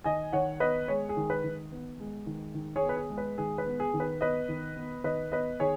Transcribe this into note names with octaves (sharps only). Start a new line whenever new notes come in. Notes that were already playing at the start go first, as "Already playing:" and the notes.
D#3 D#5 G#5
D#3 C#5 F#5
B3 B4 D#5
G#3 G#4 C#5
G#4
D#3
B4
D#3
B3
G#3
D#3
D#3
G#4 C#5
B3
B4
G#4
G#3
B4
D#3 G#4
B4
B3
G#4
D#3
B4
B3 B4 D#5
D#3
B3
D#3 B4 D#5
B3 B4 D#5
D#3 G#4 C#5